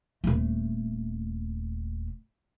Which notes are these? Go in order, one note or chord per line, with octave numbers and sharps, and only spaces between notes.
D#1 A3